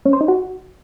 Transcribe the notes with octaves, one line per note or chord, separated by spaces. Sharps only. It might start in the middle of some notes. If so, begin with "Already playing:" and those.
C#4
C5
D#4
F#4